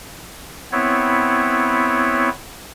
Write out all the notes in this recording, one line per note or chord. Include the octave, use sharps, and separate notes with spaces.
B3 C4 E4 C#5